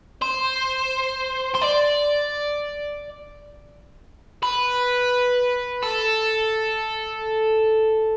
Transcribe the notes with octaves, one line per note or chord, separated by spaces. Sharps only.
C5
C5
D5
B4
A4